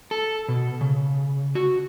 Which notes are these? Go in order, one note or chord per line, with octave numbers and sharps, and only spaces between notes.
A4
B2
C#3
F#4